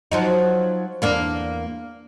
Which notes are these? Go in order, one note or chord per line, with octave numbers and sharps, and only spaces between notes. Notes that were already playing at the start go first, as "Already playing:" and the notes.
F3 F#3 D#4
E2 A#3 D4